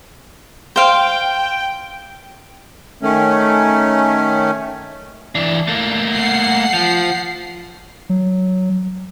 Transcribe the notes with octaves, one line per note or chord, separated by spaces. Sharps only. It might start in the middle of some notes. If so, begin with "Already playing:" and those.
C5 F5 G5
D#3 A3 C#4
E3 D4
A3 A#3
F#5 C7
F3
F#3